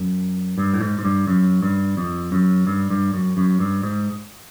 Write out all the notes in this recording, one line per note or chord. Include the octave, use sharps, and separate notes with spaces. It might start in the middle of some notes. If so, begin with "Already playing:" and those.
Already playing: F#2
G2
A2
G#2
G#2
G2
F#2
G2
F2
F#2
G2
G2
F#2
F#2
G2
G#2